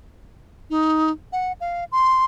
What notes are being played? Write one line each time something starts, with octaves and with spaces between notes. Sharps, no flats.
D#4
F#5
F5
C6